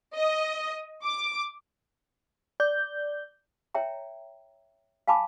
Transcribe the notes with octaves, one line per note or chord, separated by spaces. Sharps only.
D#5
D6
D5 G6
C#5 E5 G5 A#5
F5 G#5 A5 B5 D6